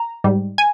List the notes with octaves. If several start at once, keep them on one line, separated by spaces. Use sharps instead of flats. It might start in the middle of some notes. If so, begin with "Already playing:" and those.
Already playing: A#5
G#2 G3
G#5